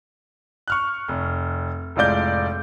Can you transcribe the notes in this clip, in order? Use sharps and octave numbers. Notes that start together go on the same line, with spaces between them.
C#6 F6 F#6
F1
F1 A2 G#3 F4 D5 G6